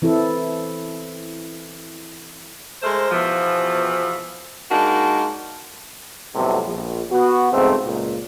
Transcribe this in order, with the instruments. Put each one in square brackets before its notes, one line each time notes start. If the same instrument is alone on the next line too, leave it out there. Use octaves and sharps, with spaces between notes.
[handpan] E3 C4 E4 A4
[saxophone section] G#3 A3 A#4 C5
E2 B2 E3 F3
G#3 A#3 D4 D#4 F#4
[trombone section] F2 A2 C3 F#3 G3 B3
A#1
B3 F#4
F2 G#2 C#3 A3 B3 C4
C#2 A#2